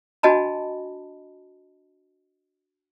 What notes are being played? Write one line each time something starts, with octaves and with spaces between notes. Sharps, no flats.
D4 F#4 D#5 G#5 A5 B5